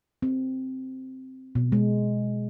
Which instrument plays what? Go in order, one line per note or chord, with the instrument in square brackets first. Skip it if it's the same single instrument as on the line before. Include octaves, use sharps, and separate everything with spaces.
[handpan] C4
B2
G#3